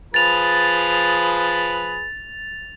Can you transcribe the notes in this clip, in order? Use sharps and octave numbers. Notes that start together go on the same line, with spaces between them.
F3 G#4 B4 A6 F7